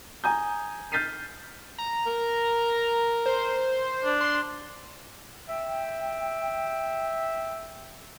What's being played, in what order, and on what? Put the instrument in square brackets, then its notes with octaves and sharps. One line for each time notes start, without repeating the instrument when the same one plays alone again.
[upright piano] G#5 A#5 D#6 G6
F6 G6 A6 B6 C7 D#7
[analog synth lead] A#5
[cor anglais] A#4
[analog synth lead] C5
[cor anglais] D4
[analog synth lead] C6
[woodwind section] E5 G5